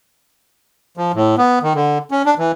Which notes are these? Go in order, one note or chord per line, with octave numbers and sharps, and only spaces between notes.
F3
A2
B3
D#3
D3
C#4
D4
E3